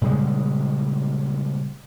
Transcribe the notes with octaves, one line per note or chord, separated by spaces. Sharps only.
A#2 C#3 G3 G#3